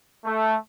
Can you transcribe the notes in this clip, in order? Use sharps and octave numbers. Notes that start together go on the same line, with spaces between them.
A3